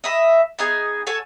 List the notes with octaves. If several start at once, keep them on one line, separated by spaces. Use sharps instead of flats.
D#5 E5 B5
B3 D#4 G#4 G#5
A4 C#5 F#5 G#5